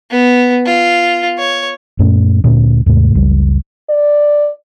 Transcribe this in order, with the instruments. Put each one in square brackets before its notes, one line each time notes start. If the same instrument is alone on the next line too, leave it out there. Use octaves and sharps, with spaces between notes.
[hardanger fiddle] B3
F4
C#5
[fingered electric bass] F#2 A#2 A3 C#4
D2 A#2 D3 C#4
D#2 G#2 C3 A3
F#1 C#2 G3
[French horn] D5